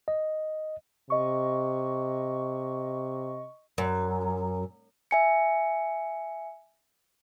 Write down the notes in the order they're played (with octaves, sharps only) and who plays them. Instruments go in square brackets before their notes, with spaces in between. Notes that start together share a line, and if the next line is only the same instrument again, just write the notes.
[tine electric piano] D#5
[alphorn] C3 [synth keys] D#5 C#6
[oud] F#2
[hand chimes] E5 G#5 C#7